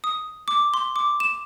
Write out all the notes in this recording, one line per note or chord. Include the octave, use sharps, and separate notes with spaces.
D#6
D6
C6
D6
E7